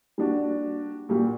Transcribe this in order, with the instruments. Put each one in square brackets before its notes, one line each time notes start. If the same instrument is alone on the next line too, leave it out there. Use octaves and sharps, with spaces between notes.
[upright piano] G3 A#3 D4 F#4
A#2 G3 A#3 F#4